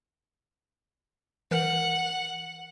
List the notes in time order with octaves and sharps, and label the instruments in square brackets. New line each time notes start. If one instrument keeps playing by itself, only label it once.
[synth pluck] E3 A#4 [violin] F#5